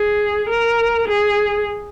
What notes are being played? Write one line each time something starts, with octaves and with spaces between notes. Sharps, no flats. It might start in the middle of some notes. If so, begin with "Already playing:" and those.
Already playing: G#4
A#4
G#4